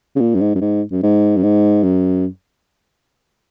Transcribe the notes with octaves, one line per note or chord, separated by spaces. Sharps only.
C#3
A#2
F#2
G#2
F#2
G#2
F#2
G#2
F#2
G#2
F#2